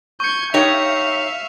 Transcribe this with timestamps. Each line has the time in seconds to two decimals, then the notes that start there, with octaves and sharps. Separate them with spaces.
0.20 C#6 G6 G#6 C#7
0.54 D#4 G4 C#5 E5 F5 F7